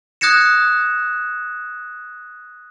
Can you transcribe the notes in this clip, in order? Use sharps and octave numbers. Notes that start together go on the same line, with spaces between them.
D#6 F#6 G#6 A#6 C#7 E7